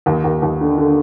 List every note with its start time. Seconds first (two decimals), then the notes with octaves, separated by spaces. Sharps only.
0.06 D#2
0.24 D#2
0.42 D#2
0.61 D3
0.78 D3